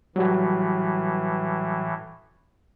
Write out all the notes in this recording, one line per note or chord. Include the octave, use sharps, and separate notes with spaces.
A2 E3 F#3 G3 F#4